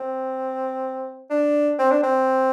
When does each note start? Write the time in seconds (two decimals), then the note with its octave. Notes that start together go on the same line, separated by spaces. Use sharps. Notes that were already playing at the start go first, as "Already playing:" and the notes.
Already playing: C4
1.30 D4
1.79 C4
1.91 D4
2.03 C4